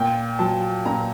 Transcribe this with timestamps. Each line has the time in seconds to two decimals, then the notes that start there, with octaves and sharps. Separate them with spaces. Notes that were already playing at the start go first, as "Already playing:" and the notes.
Already playing: A#2 G5
0.39 F#3 A5
0.85 A#2 A#5